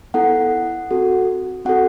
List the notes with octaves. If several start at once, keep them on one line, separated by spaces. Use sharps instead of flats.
B3 E4 A4 F#5
C4 F#4 A4
C4 F#4 A4 F#5